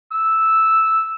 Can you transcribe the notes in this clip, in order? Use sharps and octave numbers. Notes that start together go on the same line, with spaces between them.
E6